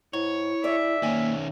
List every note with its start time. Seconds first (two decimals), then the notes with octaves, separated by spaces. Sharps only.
0.13 G#2 E4 C#5
0.64 G#4 D5 E5
1.03 D#3 A#3 C#4 G#5